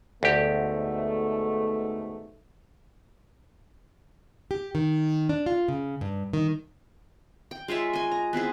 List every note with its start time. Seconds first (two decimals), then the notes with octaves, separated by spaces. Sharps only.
0.23 D2 G#2 B2 A3 G4
4.51 G4
4.75 D#3
5.29 D4
5.46 F4
5.68 C#3
6.01 G2
6.33 D#3
7.51 G5
7.68 G#3 F4 C#5 E5
7.93 D#5 G#5
8.12 A#5
8.33 B3 C4 E4 G#4